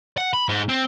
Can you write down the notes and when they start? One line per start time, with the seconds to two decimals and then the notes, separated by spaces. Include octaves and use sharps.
0.17 F#5
0.33 B5
0.49 G#2
0.69 C4